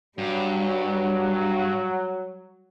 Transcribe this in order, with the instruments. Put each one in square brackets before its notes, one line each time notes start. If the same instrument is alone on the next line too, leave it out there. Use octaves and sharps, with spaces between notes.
[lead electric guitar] G2 [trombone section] F#3 [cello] G3